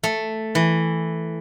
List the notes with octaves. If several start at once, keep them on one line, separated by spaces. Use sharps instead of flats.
A3
E3